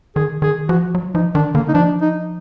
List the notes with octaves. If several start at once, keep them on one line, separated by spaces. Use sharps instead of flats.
D#3 G#4
D#3 G#4
F3 F#4
F#3
F3 D#4
D#3 D4
D3 A#3
D#4
F3 D4
D#4